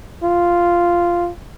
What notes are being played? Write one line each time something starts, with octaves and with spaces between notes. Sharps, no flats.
F4